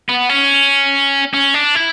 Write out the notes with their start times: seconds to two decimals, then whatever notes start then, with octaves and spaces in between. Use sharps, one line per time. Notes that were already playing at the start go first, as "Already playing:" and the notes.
0.09 B3
0.29 C#4
1.34 C#4
1.54 D4
1.75 E4